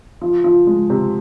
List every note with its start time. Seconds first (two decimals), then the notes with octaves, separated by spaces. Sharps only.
0.21 F3
0.44 F3
0.67 G#3
0.90 C3